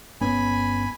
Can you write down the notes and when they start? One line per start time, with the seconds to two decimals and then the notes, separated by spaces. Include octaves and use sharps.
0.21 G1 B3 C#4 G#5 B5